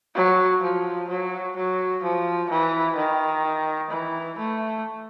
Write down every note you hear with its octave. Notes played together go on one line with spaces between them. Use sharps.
F#3
F3
F#3
F#3
F3
E3
D#3
E3
A3